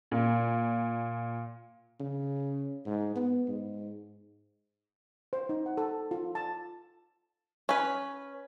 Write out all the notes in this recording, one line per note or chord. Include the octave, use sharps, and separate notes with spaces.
A#2
C#3
G#2
B3
G#2
C5
D#4
F#5
A4
F4
A5
C#4 B4